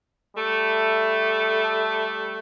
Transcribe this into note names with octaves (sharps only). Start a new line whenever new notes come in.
G3 A3